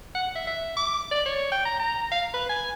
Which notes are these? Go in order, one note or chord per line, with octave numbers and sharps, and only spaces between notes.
F#5
E5
E5
D6
D5
C#5
G5
A#5
A#5
F5
B4
G#5